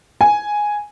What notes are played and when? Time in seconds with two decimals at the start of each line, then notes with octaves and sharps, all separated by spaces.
0.21 G#5